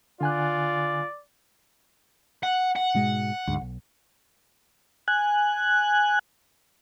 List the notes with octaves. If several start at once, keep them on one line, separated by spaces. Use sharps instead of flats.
D3 F4 D5 G#5 F#6
F#5
F#5
G#2 B2 G#3
D2 G#2
B1
G#5 F#6